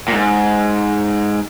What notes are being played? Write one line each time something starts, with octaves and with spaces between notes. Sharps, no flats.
A#2
G#2